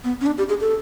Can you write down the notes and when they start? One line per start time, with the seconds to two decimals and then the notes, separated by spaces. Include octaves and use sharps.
0.04 B3
0.21 C#4
0.26 D4
0.38 G4
0.49 G#4
0.61 A4